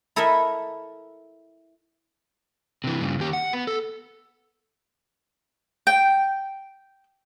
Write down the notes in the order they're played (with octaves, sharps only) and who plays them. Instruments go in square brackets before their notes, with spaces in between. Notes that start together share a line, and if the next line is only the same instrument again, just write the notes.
[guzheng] E4 A4 A#4 D#5 E5
[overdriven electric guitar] C3 E3
G2 C#3
D#2 G4
F#5
B3
A4
[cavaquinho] G5